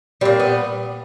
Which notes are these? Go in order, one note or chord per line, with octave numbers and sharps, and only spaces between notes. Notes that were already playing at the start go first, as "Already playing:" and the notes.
A#2 G3 C4
B3